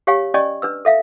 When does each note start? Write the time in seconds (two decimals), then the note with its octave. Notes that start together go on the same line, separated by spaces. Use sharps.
0.07 G4 C#5 F5 G#5 C#6
0.34 C#4 D5 D#5 G#5 C#6
0.62 D4 B4 E6
0.85 A4 E5 F5